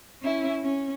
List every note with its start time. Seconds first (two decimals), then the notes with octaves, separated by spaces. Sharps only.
0.22 C#4 E4
0.64 C#4